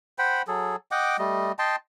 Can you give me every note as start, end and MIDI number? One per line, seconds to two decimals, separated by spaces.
0.18 0.42 72
0.18 0.42 78
0.18 0.42 79
0.18 0.42 83
0.48 0.76 54
0.48 0.76 68
0.48 0.76 69
0.91 1.17 75
0.91 1.17 78
0.91 1.17 79
0.91 1.17 86
1.19 1.52 55
1.19 1.52 57
1.19 1.52 75
1.59 1.76 75
1.59 1.76 79
1.59 1.76 81
1.59 1.76 84